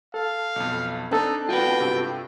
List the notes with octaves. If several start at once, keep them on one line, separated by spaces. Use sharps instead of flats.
A4 F5
B1 F2
C4 D4 D#4 A4
F4 F#4 B4 G5
G2 C3